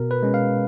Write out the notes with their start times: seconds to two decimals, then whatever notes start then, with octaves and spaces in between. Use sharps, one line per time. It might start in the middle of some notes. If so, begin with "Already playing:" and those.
Already playing: B2 A#4
0.11 B4
0.23 G#3 C#4
0.34 F5